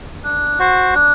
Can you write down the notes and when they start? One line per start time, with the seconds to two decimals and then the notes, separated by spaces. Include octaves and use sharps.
0.24 D4
0.59 F#4 C5
0.94 D4